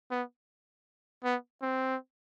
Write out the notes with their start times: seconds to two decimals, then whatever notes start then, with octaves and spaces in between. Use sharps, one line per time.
0.11 B3
1.24 B3
1.62 C4